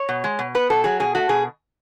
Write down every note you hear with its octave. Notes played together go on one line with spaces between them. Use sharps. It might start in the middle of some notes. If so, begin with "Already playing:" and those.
Already playing: C#5
B2
G#3
B2
B3 B4
B2 A4
F#3 G#4
B2 G#4
A3 F#4
B2 G#4